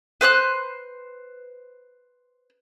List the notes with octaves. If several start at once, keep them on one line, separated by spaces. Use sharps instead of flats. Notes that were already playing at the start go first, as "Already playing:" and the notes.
B4 C5 D#6 F#6